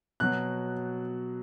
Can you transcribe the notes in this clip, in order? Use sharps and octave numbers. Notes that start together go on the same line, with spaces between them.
B2 F#3 F#6